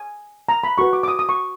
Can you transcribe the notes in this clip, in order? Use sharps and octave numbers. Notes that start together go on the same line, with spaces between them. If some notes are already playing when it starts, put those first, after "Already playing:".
Already playing: G#5
A#5
B5
F#4 B4 C#6
D6
D6
D#6
D#6
C#6